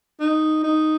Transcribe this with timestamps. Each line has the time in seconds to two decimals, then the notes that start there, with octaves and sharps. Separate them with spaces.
0.20 D#4
0.64 D#4